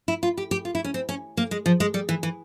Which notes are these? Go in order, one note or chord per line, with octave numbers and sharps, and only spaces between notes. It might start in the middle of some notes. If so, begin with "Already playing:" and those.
E4
F4
G4
G4
F4
E4
C#4
C4
C#4
A#3
G#3
F3
G#3
G3
E3
E3